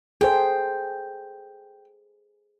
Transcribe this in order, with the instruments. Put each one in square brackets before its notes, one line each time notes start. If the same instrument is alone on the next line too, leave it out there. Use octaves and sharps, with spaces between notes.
[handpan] G#4 A4 C5 [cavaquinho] G5